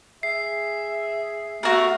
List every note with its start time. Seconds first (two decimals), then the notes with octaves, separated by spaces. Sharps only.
0.23 G#4 E5 C7
1.63 A3 F#4 A#4